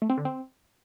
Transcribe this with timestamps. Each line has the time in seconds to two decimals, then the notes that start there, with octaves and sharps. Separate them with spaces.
0.02 A3
0.10 C4
0.17 D3
0.25 C4